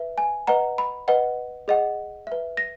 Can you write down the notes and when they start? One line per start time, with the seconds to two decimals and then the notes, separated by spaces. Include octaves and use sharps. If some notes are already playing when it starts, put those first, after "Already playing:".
Already playing: B4 E5
0.18 G#5
0.47 B4 D#5 F#5 A#5
0.78 B5
1.08 B4 D#5 F#5
1.68 G#4 D#5 F#5
2.27 B4 E5
2.57 A#6